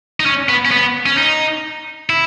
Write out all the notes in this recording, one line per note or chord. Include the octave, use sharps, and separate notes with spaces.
D#4
C#4
B3
C#4
B3
C#4
D#4
E4